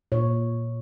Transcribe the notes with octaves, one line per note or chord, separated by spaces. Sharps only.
A#2 C#5